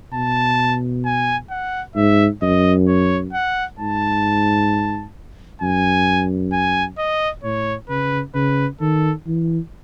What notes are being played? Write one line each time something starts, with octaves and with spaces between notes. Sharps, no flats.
B2 A5
G#5
F#5
G#2 E5
F#2 D#5
C#5
F#5
G#2 A5
F#2 G#5
G#5
D#5
A2 C#5
C#3 B4
C#3 B4
D#3 A4
E3